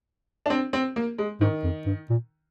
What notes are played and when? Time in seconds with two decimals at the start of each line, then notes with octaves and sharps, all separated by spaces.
0.46 D4
0.50 C4
0.73 C4
0.96 A#3
1.18 G#3
1.41 G#2 D#3
1.64 F2
1.86 G2
2.10 A#2